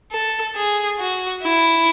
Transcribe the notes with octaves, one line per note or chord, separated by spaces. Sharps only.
A4
G#4
F#4
E4